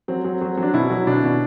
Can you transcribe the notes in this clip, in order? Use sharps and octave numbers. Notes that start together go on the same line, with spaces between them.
F#3 C4
F#3
F#3
F#3 D4
B2 E4
F#3
B2 D4
B2